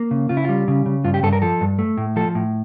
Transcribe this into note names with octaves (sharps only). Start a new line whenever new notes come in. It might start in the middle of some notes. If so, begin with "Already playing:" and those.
Already playing: A#3
C#3
C#3 F4
E4
G3 F4
C#3
C#3
G2 F4
G4
G2 A4
A#4
F3 A4
G2
A3
A2
F3 A4
A2